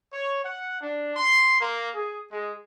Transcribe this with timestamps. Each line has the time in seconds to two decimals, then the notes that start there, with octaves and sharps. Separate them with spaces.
0.13 C#5
0.44 F#5
0.81 D4
1.15 C6
1.61 A#3
1.95 G#4
2.31 G#3